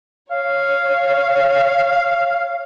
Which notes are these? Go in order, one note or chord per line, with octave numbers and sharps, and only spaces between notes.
C#5 F5